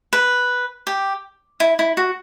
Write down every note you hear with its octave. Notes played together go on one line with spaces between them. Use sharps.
B4
G4
E4
E4
F#4